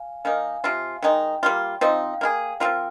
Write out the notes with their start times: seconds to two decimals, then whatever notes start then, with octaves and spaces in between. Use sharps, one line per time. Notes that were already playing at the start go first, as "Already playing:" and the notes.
Already playing: F5 G#5
0.25 D#3 A#3 D#4 F5 G#5
0.64 C3 F3 C4 F4
1.03 D#3 G#3 D#4 G5
1.43 G3 A#3 F4
1.81 F3 C4 D#4 G5
1.92 F5
2.14 F5
2.21 A#3 F4 G#4
2.60 F3 C4 F4 A#4 G5